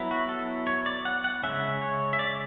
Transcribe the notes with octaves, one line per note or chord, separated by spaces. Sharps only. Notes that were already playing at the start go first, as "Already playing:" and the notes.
Already playing: F#3 B3 E4
F#4
A4
C#5
D5
F#5
F#5
C#3 G#3 C#4 E5
C#5
E5
D5